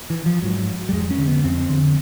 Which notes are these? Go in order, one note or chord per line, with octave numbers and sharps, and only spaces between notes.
E3
F3
G#2 F#3
G3
F2 G#3
C#4
D3
B3
F2 C4
D3